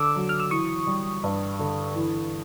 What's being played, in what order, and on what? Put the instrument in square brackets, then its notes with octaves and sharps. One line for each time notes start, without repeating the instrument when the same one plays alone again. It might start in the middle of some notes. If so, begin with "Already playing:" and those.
Already playing: [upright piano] D3 [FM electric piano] D6 E6
[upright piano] F#3
[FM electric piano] F6
E6
[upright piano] E3 [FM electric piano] C#6 D#6
[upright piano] G3
G2
D3
E3